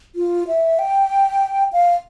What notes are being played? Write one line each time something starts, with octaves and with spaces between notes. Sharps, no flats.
F4
E5
G5
F5